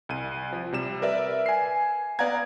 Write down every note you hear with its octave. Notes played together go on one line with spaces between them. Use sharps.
C2 D#7
F3
C3 G3 E7
A#4 B4 D5 E5
G#5 C7
B3 D5 F5 F#5 A#5 G#6